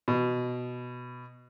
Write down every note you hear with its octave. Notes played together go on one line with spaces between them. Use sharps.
B2